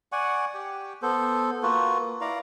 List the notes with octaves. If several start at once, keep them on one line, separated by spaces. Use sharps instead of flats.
D5 F#5 G#5 C#6
G4 G5
B3 A4 C5
A#3 F4 F#4 B4
E4 D5 F5 A#5